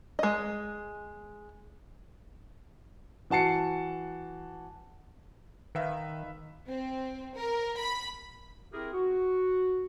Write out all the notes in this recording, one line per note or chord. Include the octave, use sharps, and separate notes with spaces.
G#3 D#5
E3 F#4 A5 C7 C#7
D#3 B4 E5 F5
C4
A#4
B5
C4 E4 G4 G#4 A#4
F#4